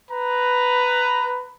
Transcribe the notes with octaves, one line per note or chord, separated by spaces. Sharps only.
B4 A#5